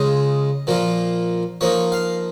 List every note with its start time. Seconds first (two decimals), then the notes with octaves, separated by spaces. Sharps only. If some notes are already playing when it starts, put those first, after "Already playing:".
Already playing: C#3 G#3 F4 D#5
0.67 A#2 F3 A#3 F4
1.61 F3 A#3 D#4 C#5
1.92 F5